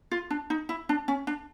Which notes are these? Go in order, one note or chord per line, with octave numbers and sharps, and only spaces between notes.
F4
D4
D#4
E4
D4
C#4
D4